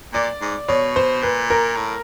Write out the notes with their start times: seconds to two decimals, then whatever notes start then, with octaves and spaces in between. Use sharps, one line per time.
0.13 A#2 D5
0.41 G#2
0.68 B2 C#5
0.96 C5
1.22 A#2 B4
1.50 A#4
1.77 A2